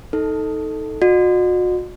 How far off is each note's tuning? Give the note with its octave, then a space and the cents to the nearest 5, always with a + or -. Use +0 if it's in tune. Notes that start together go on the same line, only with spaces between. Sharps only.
D#4 +10 A4 +0
F#4 -40 D#5 -40